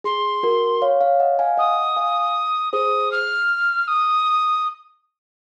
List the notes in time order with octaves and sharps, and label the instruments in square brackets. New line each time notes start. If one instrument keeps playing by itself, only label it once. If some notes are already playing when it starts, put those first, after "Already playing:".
[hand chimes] G#4 [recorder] C6
[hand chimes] F#4 A#4
C#5 F5
C#5 F5
D#5 F#5
F5 G#5
[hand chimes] D#5 F#5 [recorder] D#6
[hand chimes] F5 G#5
[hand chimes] G#4 C5 [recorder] D#6
[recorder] F6
D#6